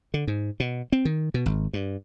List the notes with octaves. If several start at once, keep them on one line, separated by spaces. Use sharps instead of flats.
D3
G#2
B2
C4
D#3
B2
G#1
G2